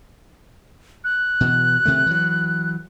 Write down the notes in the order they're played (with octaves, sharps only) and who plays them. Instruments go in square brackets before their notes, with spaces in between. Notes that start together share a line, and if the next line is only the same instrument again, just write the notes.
[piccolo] F#6
[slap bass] B2 E3
C3 D#3 A3
E3 F#3